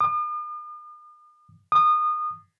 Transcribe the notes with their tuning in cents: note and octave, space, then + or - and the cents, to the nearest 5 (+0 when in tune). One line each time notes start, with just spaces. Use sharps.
D#6 -45
D#6 -25